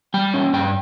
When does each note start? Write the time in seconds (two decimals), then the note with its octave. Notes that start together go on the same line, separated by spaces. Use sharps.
0.14 G3 G5
0.34 C#4
0.53 G2 G5